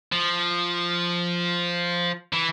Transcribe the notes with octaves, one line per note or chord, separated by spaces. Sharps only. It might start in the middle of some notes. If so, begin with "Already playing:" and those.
F3
E3